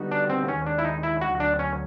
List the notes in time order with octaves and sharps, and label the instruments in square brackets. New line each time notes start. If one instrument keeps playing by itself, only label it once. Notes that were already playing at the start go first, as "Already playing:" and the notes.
Already playing: [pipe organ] D3 G3 B3 D#4 F#4
[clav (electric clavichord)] D4
C4
[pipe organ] D#2 D#3 G#3 [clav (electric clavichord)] C#4
[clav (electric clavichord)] D4
E4
D#4
E4
[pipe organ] D2 D3 F#3 [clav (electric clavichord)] F#4
[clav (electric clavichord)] D4
C#4